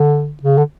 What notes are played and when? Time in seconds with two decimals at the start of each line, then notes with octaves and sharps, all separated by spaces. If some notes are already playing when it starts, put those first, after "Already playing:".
Already playing: D3
0.43 C#3
0.58 D3